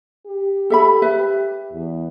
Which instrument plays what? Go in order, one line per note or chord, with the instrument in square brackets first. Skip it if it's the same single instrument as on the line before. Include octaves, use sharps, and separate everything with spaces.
[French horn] G4
[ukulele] A4 E5 B5
B4 E5
[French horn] E2